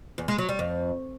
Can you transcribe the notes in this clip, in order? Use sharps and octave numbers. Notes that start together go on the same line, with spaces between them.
E2
G#3
F#3
G3
F2